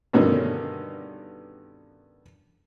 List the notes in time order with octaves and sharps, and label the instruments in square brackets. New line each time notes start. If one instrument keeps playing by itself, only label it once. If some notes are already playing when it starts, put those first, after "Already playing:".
[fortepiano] G2 B2 D3 D#3 C#4